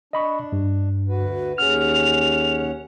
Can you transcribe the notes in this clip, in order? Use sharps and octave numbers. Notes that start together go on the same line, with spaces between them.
D4 D#5 B5 C#6
G2
D2 F#4 B4
D#2 C#4 G#4 F#5 F6 F7